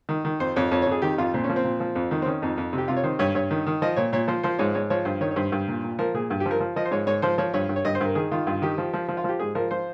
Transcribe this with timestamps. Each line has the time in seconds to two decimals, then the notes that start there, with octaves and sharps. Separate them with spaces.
0.09 D#3
0.25 D#3
0.40 F2 C5
0.56 F2 C#5
0.71 F2 C#5
0.82 C#5
0.87 F2 G#4
1.02 D#3 G4
1.18 F2 F4
1.34 A#2 C4
1.44 C#4
1.49 F3
1.56 C4
1.64 A#2
1.80 F3
1.95 F2
2.11 D#3
2.22 C4
2.26 D#3 C#4
2.42 F2 D#4
2.58 F2
2.73 C3
2.78 G4
2.88 C3 F4
2.97 C#5
3.03 D#3 C5
3.19 G2 C#5
3.35 G2 C#5
3.51 D#3
3.66 D#3
3.82 F3 D#5
3.96 A#2 C#5
4.13 A#2 C#5
4.28 F3 C5
4.43 F3 C5
4.58 G#2 C#5
4.74 G#2 C#5
4.90 F3 C#5
5.05 G2 C5
5.21 D#3 C#5
5.31 C#5
5.36 G2 C5
5.52 G2
5.68 A#2
5.83 A#2
5.99 F3 A#4
6.14 A#2 G#4
6.30 G2
6.40 G4
6.46 F3
6.51 A#4
6.60 F3
6.76 F3 D#5
6.85 C5
6.91 G#2 C#5
7.07 G#2 C#5
7.22 F3 C5
7.38 F3 C#5
7.54 G2 C#5
7.69 G2
7.76 C#5
7.85 G2 D#5
7.95 C5
8.00 G2 A#4
8.15 D#3 G#4
8.31 D#3 F4
8.47 G2 F4
8.62 D#3 G4
8.78 F3
8.94 F3
9.08 F3
9.17 F4
9.24 F3 G4
9.39 G#2 G#4
9.55 F3 A#4
9.71 F3 C5